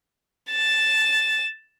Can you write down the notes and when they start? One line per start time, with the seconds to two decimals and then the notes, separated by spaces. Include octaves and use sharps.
0.51 A6 E7